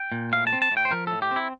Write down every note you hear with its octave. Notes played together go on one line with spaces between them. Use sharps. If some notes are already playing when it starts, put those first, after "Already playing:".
Already playing: G5
A#2
A2 F5
A5
C4
A5
A2
G5
C5
F3 A#4
A2 A4
G4
C4
E4